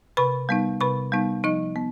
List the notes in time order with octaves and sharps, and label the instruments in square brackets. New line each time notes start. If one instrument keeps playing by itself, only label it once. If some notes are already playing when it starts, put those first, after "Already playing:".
[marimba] C3 B4 B5
G3 B3 D#4
C3 B4 B5
G3 B3 D#4
F3 D#4 D#5
B3